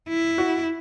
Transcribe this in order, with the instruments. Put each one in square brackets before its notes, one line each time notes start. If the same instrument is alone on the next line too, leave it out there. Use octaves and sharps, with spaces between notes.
[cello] E4
[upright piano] F#4